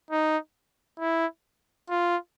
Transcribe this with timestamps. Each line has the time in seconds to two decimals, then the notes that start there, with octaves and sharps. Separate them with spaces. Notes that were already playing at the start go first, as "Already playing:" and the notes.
0.11 D#4
0.99 E4
1.90 F4